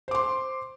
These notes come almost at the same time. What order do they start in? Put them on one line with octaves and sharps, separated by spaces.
C5 D6 C6